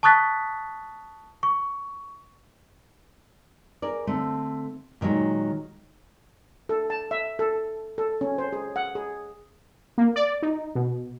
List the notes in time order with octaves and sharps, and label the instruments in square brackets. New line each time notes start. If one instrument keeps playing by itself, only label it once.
[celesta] A5 C#6 D#6 F#6 A6 B6
C#6
[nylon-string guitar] G#4 A#4 D5
D3 A3 C4
A#2 D#3 F#3 G#3
[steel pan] A4
A5
E5
A4
A4
C#4
C5
G#4
F#5
G#4
[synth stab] A#3
D5
D#4
B2